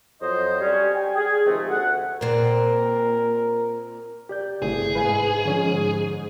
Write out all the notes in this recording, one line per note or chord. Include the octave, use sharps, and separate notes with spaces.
F2 F#3 C5 D#5
G3 C#4
G5 G#5
G#4
C3 D#3 F3 G#3 A3
D2 F#5
A#2 C4 A#4
G4 D5 G6
G1 C3 A3 E4 G#4
G#2 B4 F5 G#5
D3 F3 C#4